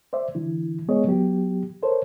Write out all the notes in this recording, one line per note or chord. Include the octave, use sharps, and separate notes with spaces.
C5 D5 E5
D3 E3 E4
G#3 B3 G#4 C#5 D#5
F#3 B3 G4
A4 A#4 C5 C#5